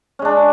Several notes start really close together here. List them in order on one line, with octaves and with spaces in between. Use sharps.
C#4 G#3 D4